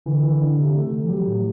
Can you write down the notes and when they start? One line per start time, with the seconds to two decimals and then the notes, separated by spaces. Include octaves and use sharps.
0.06 D3 E3
0.23 E3
0.41 D4
0.58 C3
0.75 A3
0.93 A3
1.04 E3
1.09 F#3 G4
1.27 A2